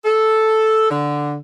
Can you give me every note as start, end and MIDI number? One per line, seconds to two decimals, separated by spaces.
0.05 0.90 69
0.90 1.35 50